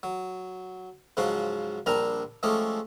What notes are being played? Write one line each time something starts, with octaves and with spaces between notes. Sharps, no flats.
F#3
G#2 C#3 F3 F#3 F#4 C5
A#1 G3 C4 D4 A#4 A#5
F3 G#3 A3 C#4 G4 G#4